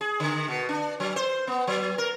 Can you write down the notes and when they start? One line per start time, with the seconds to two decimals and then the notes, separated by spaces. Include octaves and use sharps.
0.01 G#4
0.20 D3
0.48 B2
0.69 D4
1.00 F#3
1.16 C5
1.47 B3
1.67 F#3
1.98 A#4